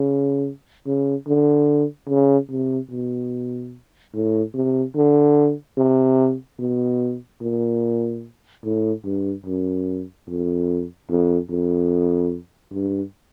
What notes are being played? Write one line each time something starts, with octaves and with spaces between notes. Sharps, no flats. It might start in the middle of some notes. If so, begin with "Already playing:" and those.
Already playing: C#3
C#3
D3
C#3
C3
B2
A2
C3
D3
C3
B2
A#2
A2
G2
F#2
F2
F2
F2
G2